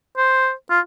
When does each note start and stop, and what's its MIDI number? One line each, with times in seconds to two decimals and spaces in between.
0.17 0.51 72
0.71 0.80 65